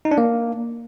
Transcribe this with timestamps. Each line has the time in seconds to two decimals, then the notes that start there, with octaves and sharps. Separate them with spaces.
0.05 D#4
0.11 D4
0.18 A#3